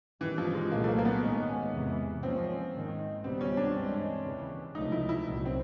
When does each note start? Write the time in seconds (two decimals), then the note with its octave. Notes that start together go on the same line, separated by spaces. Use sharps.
0.21 G2 D#3 E3 G3
0.38 F3
0.55 G#3
0.72 C2 A#2 F#3 A#3
0.84 A3
0.88 A#3
0.98 A#3
1.05 B3
1.22 G#2 D#3 G#3 C#4
1.73 E2 C3 E3 G#3
2.22 G#2 F3 A#3 C4 C#4
2.73 G#2 D#3 G#3
3.23 C#2 B2 G3 B3 C4
3.41 C#4
3.57 D4
3.75 G2 E3 G#3 C4
4.25 D#2 C#3 E3
4.75 C#2 C3 F3 A3 D#4
4.92 E4
5.09 E4
5.26 C2 A#2 F#3
5.45 C4